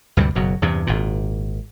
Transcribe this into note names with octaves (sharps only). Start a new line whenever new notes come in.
D2 G2 C3 G3
F#1 B2 F#3
E2 G2 C3
G#1 A#2